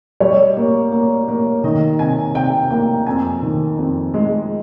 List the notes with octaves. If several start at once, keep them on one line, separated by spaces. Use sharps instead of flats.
G3 C#5
A#3
A#3
A#3
D#3 D#5
C3 G#5
C3 G5
A#3 G5
F2 G#5
D#3
F2
G#3